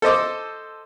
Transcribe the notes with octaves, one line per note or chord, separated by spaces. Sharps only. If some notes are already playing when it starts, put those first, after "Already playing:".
A4 C5 D#5 D6